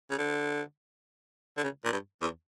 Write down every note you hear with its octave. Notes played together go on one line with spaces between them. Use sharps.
C#3
D3
D3
C#3
A#2
G2
E2